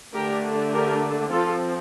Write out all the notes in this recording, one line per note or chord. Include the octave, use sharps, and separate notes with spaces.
D3 A3 D4 G4 A#4
G4 A#4
F3 C4 F4 A4